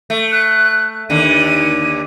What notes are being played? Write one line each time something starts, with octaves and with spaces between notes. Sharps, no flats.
A3
F#6
D#2 D3 D#7